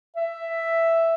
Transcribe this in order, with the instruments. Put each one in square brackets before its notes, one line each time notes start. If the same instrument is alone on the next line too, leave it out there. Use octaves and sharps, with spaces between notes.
[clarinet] E5